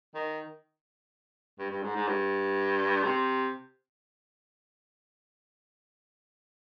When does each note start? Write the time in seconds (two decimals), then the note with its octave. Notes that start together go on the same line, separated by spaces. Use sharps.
0.15 D#3
1.59 G2
1.70 G2
1.82 G#2
1.95 G#2
2.07 G2
3.04 C3